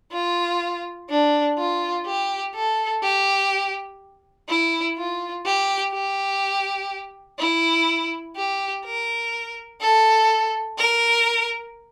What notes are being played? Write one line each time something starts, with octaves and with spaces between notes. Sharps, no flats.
F4
D4
F4
G4
A4
G4
E4
F4
G4
G4
E4
G4
A#4
A4
A#4